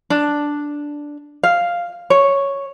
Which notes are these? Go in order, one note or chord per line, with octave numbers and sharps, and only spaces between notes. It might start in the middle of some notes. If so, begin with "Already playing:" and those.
D4
F5
C#5